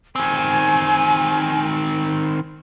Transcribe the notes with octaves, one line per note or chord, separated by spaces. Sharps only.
D#3 C4 G#5